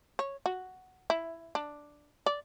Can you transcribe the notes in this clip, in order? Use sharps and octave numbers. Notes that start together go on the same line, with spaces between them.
C#5
F#4
E4
D4
D5